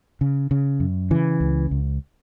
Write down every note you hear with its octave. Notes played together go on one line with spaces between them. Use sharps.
C#3
C#3
F#2
C#3 E3
C#2
C#2